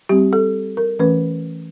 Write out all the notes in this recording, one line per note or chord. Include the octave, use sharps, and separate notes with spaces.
G3 C4 G4
A4
A#4
E3 A3 C#4 B4